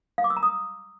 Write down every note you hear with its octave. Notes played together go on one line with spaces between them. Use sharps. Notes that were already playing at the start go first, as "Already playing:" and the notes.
F5
D6
E6
A#5
D#6